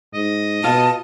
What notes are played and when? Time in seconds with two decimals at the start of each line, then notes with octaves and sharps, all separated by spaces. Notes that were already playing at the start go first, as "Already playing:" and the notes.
0.14 G#2 D#5
0.64 B2 F4 A5